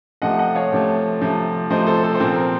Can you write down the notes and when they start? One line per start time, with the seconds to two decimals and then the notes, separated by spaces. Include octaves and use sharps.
0.22 C3 F3 A3 D#5 F#5
0.39 D#5 F#5
0.55 C#5 F5
0.72 C3 F3 A3
1.21 C3 F3 A3
1.70 C3 F3 A3 C5 D#5
1.86 A4 C5
2.03 A4 C5
2.14 C5
2.20 A#2 F3 C4 A#4
2.36 A#4